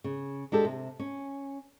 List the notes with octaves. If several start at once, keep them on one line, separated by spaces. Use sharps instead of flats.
C#3
G#3 D4 G4 A4
C3
C#4